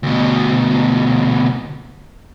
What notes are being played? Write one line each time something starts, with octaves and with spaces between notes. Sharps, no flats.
D2 B2